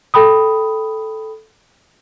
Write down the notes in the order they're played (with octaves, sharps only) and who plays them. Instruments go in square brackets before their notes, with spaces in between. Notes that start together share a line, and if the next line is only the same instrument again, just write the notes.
[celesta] A4 G5 B5 D#6